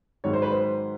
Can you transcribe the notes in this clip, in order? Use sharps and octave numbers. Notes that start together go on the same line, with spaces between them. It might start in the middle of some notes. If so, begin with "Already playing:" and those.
G#2 D#3 F#3 C#5
C5
B4
C5